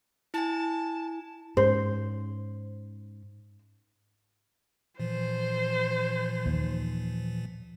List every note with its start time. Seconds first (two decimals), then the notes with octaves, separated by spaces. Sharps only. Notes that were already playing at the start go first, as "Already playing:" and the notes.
0.34 E4 G#5 A5
1.57 G#2 C#4 C5
5.00 A#2 E3 F3 C5
6.46 D#2